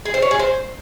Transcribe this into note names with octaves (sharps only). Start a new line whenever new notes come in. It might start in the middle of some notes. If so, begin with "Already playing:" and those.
G#4
C5
C#5
G#4
C5